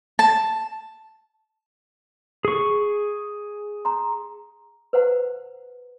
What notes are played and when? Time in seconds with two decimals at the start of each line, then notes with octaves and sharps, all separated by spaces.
0.19 A5
2.45 G#4 C#6
3.85 A#5 C6
4.93 B4 C5 F#5 A#5